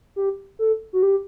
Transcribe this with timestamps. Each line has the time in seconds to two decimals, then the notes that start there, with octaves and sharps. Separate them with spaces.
0.16 G4
0.59 A4
0.93 F#4
1.03 G4